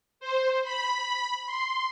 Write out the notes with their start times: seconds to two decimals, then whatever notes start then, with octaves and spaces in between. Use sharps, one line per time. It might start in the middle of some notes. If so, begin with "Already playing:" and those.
0.20 C5
0.64 B5
1.46 C6